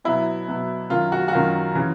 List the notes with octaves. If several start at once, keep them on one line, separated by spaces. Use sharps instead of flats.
B2 F#3 B3 E4
B2 F#3 B3
F#2 D#3 F#3 F4
F#4
F#4
F#2 D#3 F#3 F4
C#3 E3